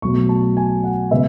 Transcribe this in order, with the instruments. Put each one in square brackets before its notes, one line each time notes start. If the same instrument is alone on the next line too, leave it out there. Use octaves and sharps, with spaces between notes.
[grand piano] B1 B2 F#3 A3 C#6
A5
G#5
F#5
C#3 G#3 B3 E5